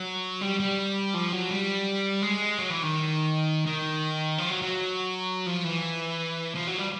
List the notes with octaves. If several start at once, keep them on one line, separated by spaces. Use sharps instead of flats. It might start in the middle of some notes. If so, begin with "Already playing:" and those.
Already playing: F#3
G3
G3
F3
F#3
G3
G#3
F#3
E3
D#3
D#3
F3
F#3
F#3
F3
E3
F3
F#3
G3